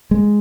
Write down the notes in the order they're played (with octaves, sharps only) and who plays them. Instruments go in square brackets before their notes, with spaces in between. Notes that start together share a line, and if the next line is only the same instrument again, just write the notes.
[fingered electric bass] G#3